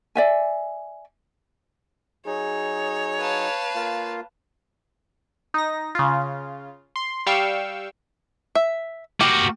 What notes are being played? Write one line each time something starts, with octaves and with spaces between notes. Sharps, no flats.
D5 E5 G#5
F#3 D#4 G#4 C#5
B4 F5 A5
A#3 F4
D#4 A#6
C#3 F4
C6
G3 F5 G5 C#6 E6
E5
A#3 F#4 G4